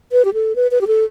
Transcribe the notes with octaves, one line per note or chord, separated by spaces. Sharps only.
B4
G4
A4
B4
B4
G4
A4